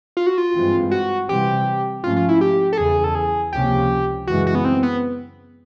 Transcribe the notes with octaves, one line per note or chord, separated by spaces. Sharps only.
F4
F#4
F4
G2 E3 G#3 C4
F#4
C3 E3 G3 C4 G4
G#2 F3 A3 C#4 F4
F4
E4
G4
A4
E2 C#3 E3 G#4
A4
G#4
C#2 C3 F3 A#3 C#4 G4
F#2 C#3 E3 G#3 F#4
F#4
B3
C4
B3